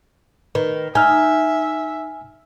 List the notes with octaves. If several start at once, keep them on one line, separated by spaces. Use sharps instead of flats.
D#3 B4
D#4 E5 G#5 F6